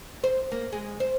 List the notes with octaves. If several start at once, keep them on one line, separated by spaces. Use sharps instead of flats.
C5
A#3
G#3
C5